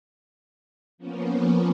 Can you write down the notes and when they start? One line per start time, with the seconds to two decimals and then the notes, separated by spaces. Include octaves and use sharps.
0.98 F3 A#3 B3 C#4